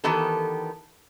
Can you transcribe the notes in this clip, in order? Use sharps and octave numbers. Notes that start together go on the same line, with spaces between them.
D#3 E3 B3 G4 A4